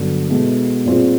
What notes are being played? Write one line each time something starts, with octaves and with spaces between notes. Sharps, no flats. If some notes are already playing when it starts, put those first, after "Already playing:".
Already playing: G2 D3 F#3 B3
B2 G#3 B3 E4 A4
A#2 G3 C4 F4 G#4